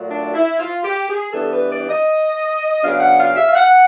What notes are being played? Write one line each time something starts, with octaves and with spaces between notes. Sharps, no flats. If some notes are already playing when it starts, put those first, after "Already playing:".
Already playing: A#2 F#3 A3
D4
E4
F4
G4
G#4
E3 G3 B3 D4 A4
B4
D5
D#5
C#3 F#3 B3 D4 F5
F#5
F5
E5
F5
F#5